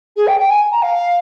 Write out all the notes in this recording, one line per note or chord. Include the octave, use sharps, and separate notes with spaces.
G#4
G5
G5
G#5
A#5
F5